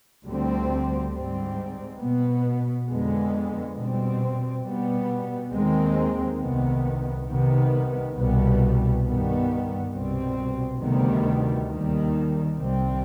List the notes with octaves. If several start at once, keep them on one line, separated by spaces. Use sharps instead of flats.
D2 D3 G3 C4
G#2 G3 C4
B2 B3
F2 D3 G#3 B3
B2 G3 C4
B2 G3 B3
D#2 D#3 G#3 C4
C2 C3 D#3 B3
C2 C3 D#3 B3
C2 B2 G3 B3
G2 D#3 G3 B3
C2 B2 G3 C4
D2 C3 D#3 G3 B3
D#2 D#3 G3
C2 C3 G3 C4